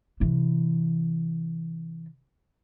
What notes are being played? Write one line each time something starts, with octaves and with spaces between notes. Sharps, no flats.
C3 E3